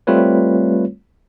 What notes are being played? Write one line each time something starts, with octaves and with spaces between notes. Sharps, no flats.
G3 A3 C4 F4 B4 C#5